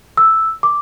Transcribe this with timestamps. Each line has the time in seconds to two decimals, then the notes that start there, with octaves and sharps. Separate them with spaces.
0.17 E6
0.63 D6